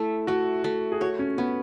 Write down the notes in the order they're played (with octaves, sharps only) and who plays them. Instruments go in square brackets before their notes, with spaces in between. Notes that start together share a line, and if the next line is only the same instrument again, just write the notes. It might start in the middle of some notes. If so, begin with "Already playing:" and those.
Already playing: [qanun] A3 [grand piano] E4
[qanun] A3 [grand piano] F#4
[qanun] A3
[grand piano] G#4
[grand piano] F#4 [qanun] C#5
[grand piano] C#4
[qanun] B3 [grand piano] C#4